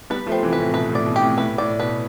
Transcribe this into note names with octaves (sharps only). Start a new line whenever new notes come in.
G3 B3 B4
F3 A3
C4
C3 E3
B4
A2 C3
B2 B4
A2
D5
B2
G4
A2 C3
A2 B4
A2 D5
B2 B4